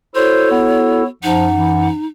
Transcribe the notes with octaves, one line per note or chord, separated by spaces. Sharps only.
E4 F#4 A4 C5 C#5
B3
F#2 F3 D#4 F#5
E3